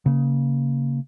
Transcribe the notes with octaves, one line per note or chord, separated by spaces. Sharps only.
C#3 A#3